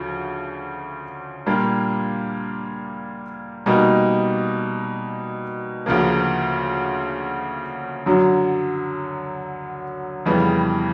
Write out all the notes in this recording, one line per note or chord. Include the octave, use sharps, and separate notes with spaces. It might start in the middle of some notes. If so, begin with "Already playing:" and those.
Already playing: D2 C#3 F3
A#2 G3 A#3 D4 F4
B2 G3 A#3 D#4
D2 C#3 F3 A#3
F#2 D3 F#3
F2 C#3 E3 G3 B3